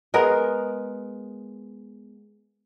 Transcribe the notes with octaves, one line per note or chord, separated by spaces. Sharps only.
G#3 B3 G#4 A#4